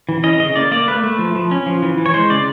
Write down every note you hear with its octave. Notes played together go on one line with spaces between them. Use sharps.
E3
C#4 D#5
C#3 D#5
A#3 D5
A#3 D5
A3 B4
A3
F3
F3
C#4
F3
E3
E3
C#5
G#3 C5
C#3 D5